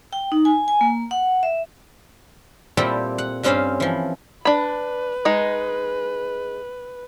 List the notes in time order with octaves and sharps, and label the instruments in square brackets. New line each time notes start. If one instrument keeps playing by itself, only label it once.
[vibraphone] G5
D#4
G#5
G#5
A#3
F#5
E5
[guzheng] A#2 G3 C4 E4 G4 A4
F#5
G2 G3 C4 C#4 C5 F5
E3 F3
[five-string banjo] D4 B5 [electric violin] B4
[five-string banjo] G#3 D#4